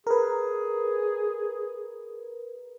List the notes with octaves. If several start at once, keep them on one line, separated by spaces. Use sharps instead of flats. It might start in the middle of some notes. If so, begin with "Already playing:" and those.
G#4 A#4 B4